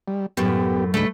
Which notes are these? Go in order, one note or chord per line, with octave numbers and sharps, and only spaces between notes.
G3
F#2 A2 B3 G4
D2 G#2 A3 B4